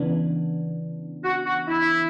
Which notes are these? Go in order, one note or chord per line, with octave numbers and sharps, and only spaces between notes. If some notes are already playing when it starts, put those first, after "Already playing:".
Already playing: C#3 E3 B3 D4
F#4
F#4
E4